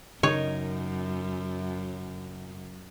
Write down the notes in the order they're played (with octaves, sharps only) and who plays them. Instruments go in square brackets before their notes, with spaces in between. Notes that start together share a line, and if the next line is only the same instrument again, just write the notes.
[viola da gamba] F#2 [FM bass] C#3 [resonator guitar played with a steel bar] D#4 A#4 [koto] C#5